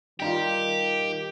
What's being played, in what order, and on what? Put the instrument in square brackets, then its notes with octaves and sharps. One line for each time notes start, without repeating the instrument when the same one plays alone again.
[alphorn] D#3 [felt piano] G3 D#4 F4 [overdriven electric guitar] G4